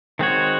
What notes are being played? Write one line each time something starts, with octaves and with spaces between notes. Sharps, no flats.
D#3 G#3 C4 F#4 C#5